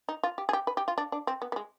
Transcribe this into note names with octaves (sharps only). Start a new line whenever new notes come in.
D#4
F4
G4
G#4
G4
B4
G4
F4
D4
D4
C4
B3
B3
G#3